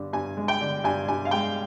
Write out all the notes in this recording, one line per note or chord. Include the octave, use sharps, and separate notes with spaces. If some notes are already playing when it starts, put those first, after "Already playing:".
Already playing: G2 D3
G2 G#5
G#3
G5
D3
G2 G#5
G2 G#5
F5
G#3 G5